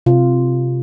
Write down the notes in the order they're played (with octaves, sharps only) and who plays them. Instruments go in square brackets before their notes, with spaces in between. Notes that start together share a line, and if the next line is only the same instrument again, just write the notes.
[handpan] C3 F4